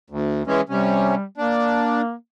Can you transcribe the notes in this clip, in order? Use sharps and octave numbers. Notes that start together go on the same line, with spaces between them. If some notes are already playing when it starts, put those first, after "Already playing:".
D2
E3 G#3 C#4
C3 G3 C#4
A#3 D4